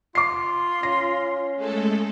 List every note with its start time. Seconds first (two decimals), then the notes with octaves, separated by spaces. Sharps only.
0.15 F4 D6 C7
0.83 C#4 A#6
1.56 G#3 A3 A4